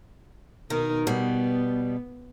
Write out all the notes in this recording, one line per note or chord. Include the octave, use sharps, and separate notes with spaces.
B2 D#3 D#4 A#4
B2 G3 B3